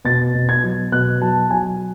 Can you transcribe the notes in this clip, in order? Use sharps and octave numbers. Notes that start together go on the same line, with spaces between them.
B2 A6
B2
G#6
F#3
B2 F#6
F#3 A5
F#3 G#5